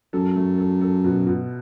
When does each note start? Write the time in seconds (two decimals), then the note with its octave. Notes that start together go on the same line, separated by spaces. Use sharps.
0.13 F#2 A4
0.36 A3
0.58 A4
0.81 A4
1.04 B2
1.27 B2